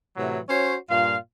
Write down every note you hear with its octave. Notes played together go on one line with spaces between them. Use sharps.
A2 C3 E3 F#3
C#4 F#4 C5 C#5
G2 A#2 F4 F5